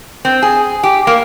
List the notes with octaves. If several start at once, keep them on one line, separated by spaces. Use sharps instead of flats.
C4
G#4
G4
A#3